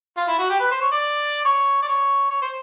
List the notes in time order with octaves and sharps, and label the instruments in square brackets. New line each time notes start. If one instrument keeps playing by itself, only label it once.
[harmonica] F4
E4
F#4
G4
B4
C5
C#5
D5
C#5
D5
C#5
C#5
C5